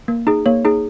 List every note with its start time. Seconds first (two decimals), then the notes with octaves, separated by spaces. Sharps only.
0.08 A#3
0.27 D#4 G#4
0.46 A#3 C#5
0.65 D#4 G#4